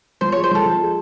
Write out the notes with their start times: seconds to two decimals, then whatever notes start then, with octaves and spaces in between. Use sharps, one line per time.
0.21 F3 C5
0.32 C#5
0.36 G#3
0.44 C5
0.51 F3 A4
0.66 F3
0.81 G#3